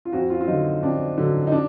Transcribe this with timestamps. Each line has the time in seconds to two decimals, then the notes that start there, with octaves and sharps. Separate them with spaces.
0.05 F4
0.13 F2 F#4
0.30 F4
0.41 F4
0.48 D3 F#3 D#4
0.83 F2 D4
1.18 D3 F#3
1.47 D#4
1.52 D4